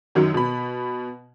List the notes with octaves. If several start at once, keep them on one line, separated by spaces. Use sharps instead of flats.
F#2 D#3 F#3
B2 B5